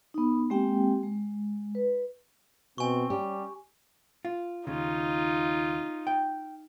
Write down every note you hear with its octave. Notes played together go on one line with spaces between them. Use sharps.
B3 D#4
G#3 A#3 C4 G4 G5
G#3
B4
B2 C4 G#5 C#6
G3 C#4 G4
F4
D#2 C#3 D#4 F4
G5